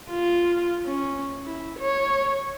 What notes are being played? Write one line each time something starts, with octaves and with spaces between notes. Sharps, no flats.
F4
C#4
E4
C#5